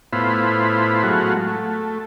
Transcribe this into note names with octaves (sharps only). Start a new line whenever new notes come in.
A2 B3 E4 F4 C5 B5
F#3 G#3 A3 F4 F#4
A3